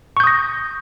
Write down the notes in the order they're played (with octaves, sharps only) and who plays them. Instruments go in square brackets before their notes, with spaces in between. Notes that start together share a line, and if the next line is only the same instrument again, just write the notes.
[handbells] C#6
G6
D#6
A#6